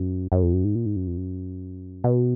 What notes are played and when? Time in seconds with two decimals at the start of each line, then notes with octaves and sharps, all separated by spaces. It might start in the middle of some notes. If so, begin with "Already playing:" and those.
Already playing: F#2
0.32 F#2
0.43 F2
0.53 F#2
0.64 G#2
0.75 A#2
0.86 G#2
0.96 F#2
1.07 F2
1.17 F#2
2.04 B2